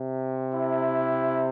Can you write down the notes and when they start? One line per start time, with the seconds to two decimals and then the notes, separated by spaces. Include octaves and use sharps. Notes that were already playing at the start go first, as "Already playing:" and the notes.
Already playing: C3
0.54 E4